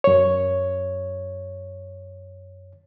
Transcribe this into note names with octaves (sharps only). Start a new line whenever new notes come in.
F#2 C#5